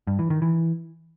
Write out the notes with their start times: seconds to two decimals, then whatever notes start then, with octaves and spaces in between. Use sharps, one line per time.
0.07 G2
0.19 E3
0.30 D#3
0.42 E3